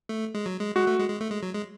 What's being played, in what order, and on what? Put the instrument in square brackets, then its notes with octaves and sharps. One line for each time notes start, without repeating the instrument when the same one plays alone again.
[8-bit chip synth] A3
G#3
F#3
G#3
[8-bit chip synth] G#3 [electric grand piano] F#4
[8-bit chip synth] A3
G#3
G#3
A3
G#3
F#3
G#3